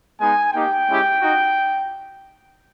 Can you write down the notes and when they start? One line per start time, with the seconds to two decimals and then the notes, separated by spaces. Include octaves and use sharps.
0.20 G#3 B3 D#4 G#5
0.54 A#3 D#4 G4 G5
0.89 G#3 C#4 E4 G4
1.22 D#4 F#4